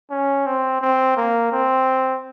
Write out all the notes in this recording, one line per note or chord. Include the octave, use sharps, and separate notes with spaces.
C#4
C4
C4
A#3
C4